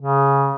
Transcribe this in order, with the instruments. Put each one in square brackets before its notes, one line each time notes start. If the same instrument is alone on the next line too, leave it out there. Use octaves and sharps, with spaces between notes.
[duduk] C#3